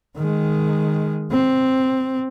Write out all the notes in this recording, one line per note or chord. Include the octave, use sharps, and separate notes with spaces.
D#3 G#3
C4